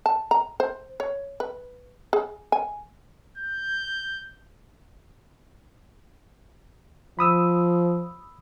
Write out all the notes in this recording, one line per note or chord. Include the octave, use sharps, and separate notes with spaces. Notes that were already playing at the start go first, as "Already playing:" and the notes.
A5
A#5
C5
C#5
B4
G#4
G#5
G6
F3 B5 D#6 E6